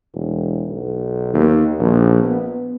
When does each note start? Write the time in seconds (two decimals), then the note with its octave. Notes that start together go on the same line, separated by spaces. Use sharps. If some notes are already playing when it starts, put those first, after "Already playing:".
0.14 E1
0.69 B1
1.33 D#2
1.79 A#1
2.24 B3